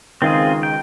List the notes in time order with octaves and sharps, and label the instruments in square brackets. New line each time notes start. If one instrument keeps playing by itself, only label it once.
[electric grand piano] C#2 D#3 [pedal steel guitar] C4 F4 G#4
[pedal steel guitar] G5